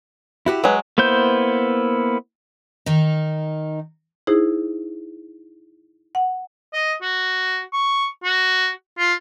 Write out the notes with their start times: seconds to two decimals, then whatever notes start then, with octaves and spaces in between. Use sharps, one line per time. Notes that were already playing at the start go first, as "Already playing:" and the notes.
0.46 E4 F#4 G4
0.64 F#3 G#3 B4
0.98 A#3 B3 E4 C5 G6
2.86 D#3 D#4
4.27 D#4 E4 G#4 C5
6.15 F#5
6.73 D#5
7.02 F#4
7.73 C#6
8.24 F#4
8.99 F4